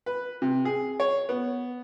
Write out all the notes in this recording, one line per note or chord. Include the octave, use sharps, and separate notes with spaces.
B4
C3
G#4
C#5
B3